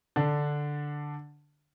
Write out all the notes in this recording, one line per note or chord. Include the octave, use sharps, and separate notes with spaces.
D3 D4